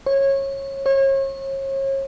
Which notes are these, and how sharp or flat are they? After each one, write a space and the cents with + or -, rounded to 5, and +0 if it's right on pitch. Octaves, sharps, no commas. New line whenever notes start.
C#5 -20
C#5 -35